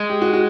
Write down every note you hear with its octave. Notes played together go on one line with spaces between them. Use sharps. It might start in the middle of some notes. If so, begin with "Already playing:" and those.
Already playing: G#3
G4
F#4
F#4